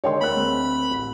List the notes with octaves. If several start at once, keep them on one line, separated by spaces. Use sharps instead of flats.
D3 D#3 G#3 C#5 G5 C6
D2 A#4 B5 F#6
G#3 C4
A1